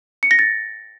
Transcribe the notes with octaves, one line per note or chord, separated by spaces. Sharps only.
C#7
A#6
A6